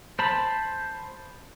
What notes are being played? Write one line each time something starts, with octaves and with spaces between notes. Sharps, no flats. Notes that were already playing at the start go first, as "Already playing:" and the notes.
C5 A5 B5